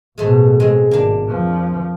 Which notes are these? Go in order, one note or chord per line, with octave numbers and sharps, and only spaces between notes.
A1 B2 G#3 A3 C5
G#3 C4
G#1 A#3 D4
F2 F3